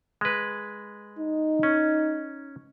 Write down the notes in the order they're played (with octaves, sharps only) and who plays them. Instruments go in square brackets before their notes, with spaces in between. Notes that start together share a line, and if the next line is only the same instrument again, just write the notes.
[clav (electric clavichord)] G#3 B4
[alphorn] D#4
[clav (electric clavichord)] C#4